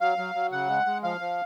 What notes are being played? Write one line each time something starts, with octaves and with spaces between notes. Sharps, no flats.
F#3 F5
F#3
F#3
C#3 F#5
G#3
G#3
F3 F5
F3